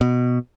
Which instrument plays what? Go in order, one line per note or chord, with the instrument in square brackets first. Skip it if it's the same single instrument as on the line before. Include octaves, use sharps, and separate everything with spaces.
[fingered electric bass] B2